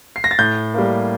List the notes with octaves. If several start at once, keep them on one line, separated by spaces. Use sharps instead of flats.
C7
A#6
A6
A2 G6
G3 A#3